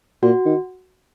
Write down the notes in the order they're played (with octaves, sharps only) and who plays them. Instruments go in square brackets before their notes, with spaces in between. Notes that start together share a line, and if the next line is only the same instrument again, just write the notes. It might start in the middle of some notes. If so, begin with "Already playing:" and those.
[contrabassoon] A#2 [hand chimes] F#4
[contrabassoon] D#3